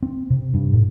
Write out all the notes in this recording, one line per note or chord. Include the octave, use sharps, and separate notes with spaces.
C4
C3
G2
A2